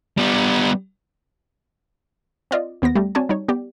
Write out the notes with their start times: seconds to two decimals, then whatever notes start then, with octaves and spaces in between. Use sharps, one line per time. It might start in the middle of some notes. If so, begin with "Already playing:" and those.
0.18 G3 B3
2.51 C4 F4 D5 D#5
2.82 D#2 B3 C5 A#6
2.95 G3 A3 G4
3.15 C4 F#4 C#5 D5 G#5 A5
3.29 G3 D#4 C#5
3.48 B3 G4 D5